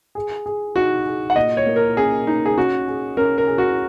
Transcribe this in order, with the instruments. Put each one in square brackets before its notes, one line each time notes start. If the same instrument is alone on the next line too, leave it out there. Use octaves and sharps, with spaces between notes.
[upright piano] G#4
G#4
[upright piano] D#4 [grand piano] F#4
[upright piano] G#4
[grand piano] F#5
[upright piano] A#2 [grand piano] D#5
[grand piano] C#5
[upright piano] A#3
[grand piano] A#4
[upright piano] C#4 [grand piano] G#4
[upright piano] A#3 [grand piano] D#4
[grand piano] G#4
[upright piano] C#4 [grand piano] F#4
[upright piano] G#4
[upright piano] C#4 [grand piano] A#4
[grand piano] A#4
[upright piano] G#4
[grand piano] F#4